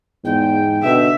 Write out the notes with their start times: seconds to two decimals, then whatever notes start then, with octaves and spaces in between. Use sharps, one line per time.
0.24 E2 G#2 G5
0.83 B2 D3 E5